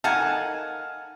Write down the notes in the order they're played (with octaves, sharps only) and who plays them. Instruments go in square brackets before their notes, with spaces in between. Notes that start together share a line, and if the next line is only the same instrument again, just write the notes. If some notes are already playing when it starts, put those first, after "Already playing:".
[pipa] D#4 A4 A#4 [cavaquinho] F5 F#5 [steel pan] G#5 A5